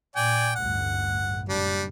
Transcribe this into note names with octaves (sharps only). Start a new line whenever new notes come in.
A#2 D5 G5 G#5
A1 D2 G2 F#5
F#1 A2 G3 D4